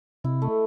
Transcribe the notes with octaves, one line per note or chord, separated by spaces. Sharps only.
C3 E4
A3